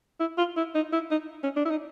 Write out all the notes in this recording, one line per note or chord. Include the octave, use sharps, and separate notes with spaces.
E4
F4
E4
D#4
E4
D#4
C#4
D4
E4
D#4